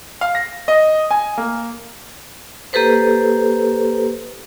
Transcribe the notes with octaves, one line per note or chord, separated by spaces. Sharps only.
F5
A#6
D#5
G#5
A#3
A#3 G4 A4 B4 C5